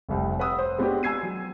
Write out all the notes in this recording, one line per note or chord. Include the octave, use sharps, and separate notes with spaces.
F1 C2 G5
B4 F#5 D#6 E6 F#6
C5
G#3 B3 C4 D4 F#4 G4
G#5 E6 G#6 C7 D#7
F#3